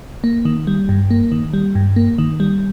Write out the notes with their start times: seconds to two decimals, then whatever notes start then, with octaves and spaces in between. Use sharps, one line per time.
0.24 A#3
0.45 D#3
0.67 G3
0.89 G2
1.11 A#3
1.32 D#3
1.54 G3
1.75 G2
1.96 A#3
2.18 D#3
2.40 G3